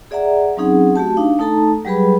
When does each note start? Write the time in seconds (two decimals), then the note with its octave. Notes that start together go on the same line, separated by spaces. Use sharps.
0.11 G#4 D5 E5 F#5 A#5
0.57 F#3 C4 C#4 D#4 G#4 F#5
0.96 A3 F#4 G4 A5
1.17 D4 D#4 F5
1.39 A3 D#4 A4 A5 A#5
1.85 F#3 G3 G4 G#4 B4 B5